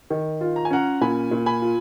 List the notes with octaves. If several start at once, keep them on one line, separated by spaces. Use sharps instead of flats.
D#3
F4
A#5
G#5
C#4 F#5 A#5
A#2 G#5 B5
A#2
G#5 B5
F4